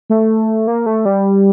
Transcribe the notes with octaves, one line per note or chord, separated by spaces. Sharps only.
A3
A#3
A3
G3